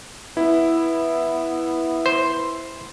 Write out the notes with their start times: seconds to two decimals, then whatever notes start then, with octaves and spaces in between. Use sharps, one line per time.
0.37 B3 E4
2.06 C5